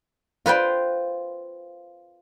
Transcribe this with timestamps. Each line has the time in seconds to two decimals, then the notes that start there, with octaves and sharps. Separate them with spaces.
0.46 F4 B4 C5 G5